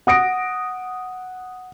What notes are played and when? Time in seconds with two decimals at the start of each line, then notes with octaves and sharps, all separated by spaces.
0.07 F#5 D#6 A#6 D7